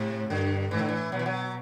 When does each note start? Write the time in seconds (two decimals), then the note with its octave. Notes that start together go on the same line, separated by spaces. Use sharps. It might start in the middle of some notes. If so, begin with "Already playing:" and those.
Already playing: A2 C3
0.30 G2 D3
0.71 A2 E3
0.79 D3
0.88 E3
1.12 B2 F#3
1.19 E3
1.26 F#3